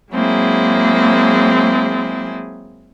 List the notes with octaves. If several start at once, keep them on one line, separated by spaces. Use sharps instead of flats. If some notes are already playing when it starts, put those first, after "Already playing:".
F#3 G#3 A#3 C4 E4 G#4